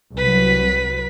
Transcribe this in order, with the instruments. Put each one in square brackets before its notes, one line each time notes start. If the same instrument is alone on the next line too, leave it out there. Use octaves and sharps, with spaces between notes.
[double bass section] C2 F#3 [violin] B4 B6